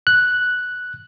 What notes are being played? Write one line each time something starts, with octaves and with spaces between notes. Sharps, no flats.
F#6